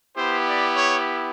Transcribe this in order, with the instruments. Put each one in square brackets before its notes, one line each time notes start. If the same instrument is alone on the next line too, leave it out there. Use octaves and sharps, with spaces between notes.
[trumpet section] B3 E4 G4 C5
D5
C#5